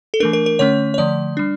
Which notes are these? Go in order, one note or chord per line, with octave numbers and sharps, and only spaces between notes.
A4
E3 A3 D4 A#4
A#4
A#4
D3 A3 C#4 C#5
C#5
D3 F3 A3 D5
G3 D4